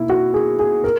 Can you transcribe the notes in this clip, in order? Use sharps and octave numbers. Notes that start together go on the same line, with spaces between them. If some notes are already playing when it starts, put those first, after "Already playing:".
Already playing: B2 A#3 D#4 E4
F#4
G#4
G#4
A#4